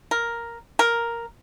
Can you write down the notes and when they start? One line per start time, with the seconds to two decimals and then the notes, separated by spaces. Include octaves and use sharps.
0.11 A#4
0.79 A#4